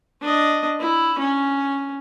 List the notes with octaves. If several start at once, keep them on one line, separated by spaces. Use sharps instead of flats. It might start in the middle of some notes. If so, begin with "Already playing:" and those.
D4 D#5
E4
C#4